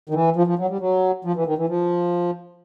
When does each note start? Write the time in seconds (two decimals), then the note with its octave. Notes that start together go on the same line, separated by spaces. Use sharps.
0.09 D#3
0.14 E3
0.36 F3
0.47 F3
0.59 F#3
0.70 G3
0.80 F#3
1.25 F3
1.36 E3
1.46 D#3
1.58 E3
1.69 F3